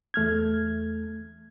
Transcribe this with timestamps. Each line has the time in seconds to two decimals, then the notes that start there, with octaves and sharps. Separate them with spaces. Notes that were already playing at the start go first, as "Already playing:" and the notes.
0.14 E2 A3 F6 G#6